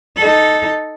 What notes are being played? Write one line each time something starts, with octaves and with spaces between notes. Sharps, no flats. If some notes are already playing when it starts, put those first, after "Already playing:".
D#4 A4